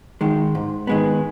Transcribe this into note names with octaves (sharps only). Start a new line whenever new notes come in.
D#3 G#3
G#2
D#3 G#3 B3